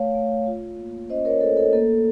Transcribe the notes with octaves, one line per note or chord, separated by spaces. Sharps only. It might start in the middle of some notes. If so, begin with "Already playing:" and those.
Already playing: A3 C#5 F5
A3
F4
A#3
C#4 C5 D#5
A#4 C#5
A3 A4 C5
A4
A#3 A4